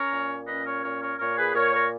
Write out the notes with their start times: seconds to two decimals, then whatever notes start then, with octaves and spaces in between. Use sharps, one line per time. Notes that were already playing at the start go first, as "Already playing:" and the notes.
Already playing: C#4 A#4 C#5
0.12 A#2
0.48 C#4 B4 D#5
0.65 A#4 C#5
0.83 A#2 A#4 C#5
1.01 A#4 C#5
1.19 A#2 A#4 C#5
1.37 G#4 B4
1.55 A#2 A#4 C#5
1.73 A#4 C#5